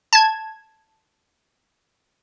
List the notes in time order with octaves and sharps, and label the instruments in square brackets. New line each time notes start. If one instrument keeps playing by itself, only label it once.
[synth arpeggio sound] A5 G#6